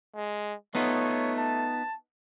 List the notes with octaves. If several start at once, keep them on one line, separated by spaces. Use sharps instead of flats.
G#3
A3 B3 D#4 F4 C#5
A5